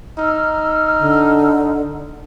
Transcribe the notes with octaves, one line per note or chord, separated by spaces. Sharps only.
D#4 E6 F6
D3